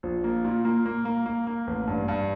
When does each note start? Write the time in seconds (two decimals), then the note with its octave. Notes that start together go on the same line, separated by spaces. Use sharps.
0.03 A#1
0.24 A#3
0.45 A#2
0.65 A#3
0.86 A#3
1.05 A#3
1.26 A#3
1.47 A#3
1.67 A1
1.87 G2
2.08 G2